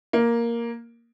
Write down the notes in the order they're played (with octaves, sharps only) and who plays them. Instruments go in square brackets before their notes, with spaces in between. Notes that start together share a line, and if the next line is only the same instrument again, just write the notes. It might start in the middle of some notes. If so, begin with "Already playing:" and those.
[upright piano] A#3